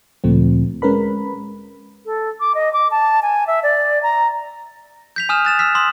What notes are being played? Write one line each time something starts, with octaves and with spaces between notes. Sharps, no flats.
D2 A#2 F3 A3 C4
G#3 C#4 A#4 B4 B5
A4
D6
D#5
D6
A5
G#5
E5
D5
A#5
G6 B6 F7
G#5 D#6 F6 E7
F#6 A6 E7
E6 F6 B6 E7
C6 D#6 B6 F#7